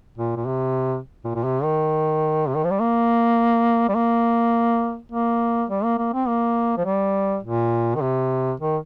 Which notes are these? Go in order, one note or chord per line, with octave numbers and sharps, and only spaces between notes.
A#2
A#2
C3
A#2
A#2
C3
D#3
C3
D#3
F3
G3
A#3
G3
A#3
A#3
G3
A#3
A#3
C4
A#3
F3
G3
A#2
D#3
C3
D#3